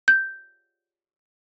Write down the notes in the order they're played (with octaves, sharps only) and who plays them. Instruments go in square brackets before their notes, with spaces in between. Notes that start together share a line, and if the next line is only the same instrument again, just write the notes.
[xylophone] G6